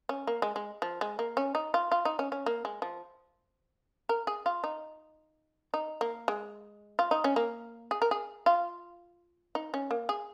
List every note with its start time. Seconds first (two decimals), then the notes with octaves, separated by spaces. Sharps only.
0.09 C#4
0.27 A#3
0.42 G#3
0.56 G#3
0.82 F3
1.01 G#3
1.19 A#3
1.37 C#4
1.55 D#4
1.74 F4
1.92 F4
2.05 D#4
2.19 C#4
2.32 C#4
2.46 A#3
2.65 G#3
2.82 F3
4.09 A#4
4.27 G#4
4.46 F4
4.64 D#4
5.74 D#4
6.01 A#3
6.28 G#3
6.99 F4
7.11 D#4
7.24 C#4
7.36 A#3
7.91 G#4
8.02 A#4
8.11 G#4
8.46 F4
9.55 D#4
9.74 C#4
9.91 A#3
10.09 G#4